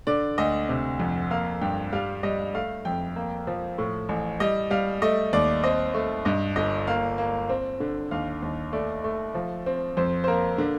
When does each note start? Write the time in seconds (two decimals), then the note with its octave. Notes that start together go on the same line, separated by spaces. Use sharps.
0.07 D3 D5
0.38 D2 D#5
0.69 C3
1.00 F2
1.31 A#3 F5
1.61 G2 G5
1.93 G3 F5
2.23 G3 D#5
2.54 A3 F5
2.85 F2 G5
3.16 A#3
3.47 F3
3.78 A2
4.09 A1
4.40 G3 D#5
4.70 G3 F5
5.02 A3 D#5
5.33 D#2 D5
5.63 C4 D#5
5.94 A3
6.25 G2 D#5
6.56 G1 D#5
6.87 A#3 F5
7.18 A#3
7.49 C4
7.80 D3
8.11 D#2 F5
8.42 D#2
8.73 A3 D5
9.04 A3
9.35 F3
9.66 C4
9.97 F2 C5
10.24 C5
10.27 A#3 A#4
10.58 D3